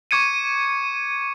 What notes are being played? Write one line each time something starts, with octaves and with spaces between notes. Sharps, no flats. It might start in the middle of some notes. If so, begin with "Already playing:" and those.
C#6 D6 G#6 C#7 D#7